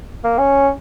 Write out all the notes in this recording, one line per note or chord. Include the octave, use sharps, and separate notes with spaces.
A#3
C#4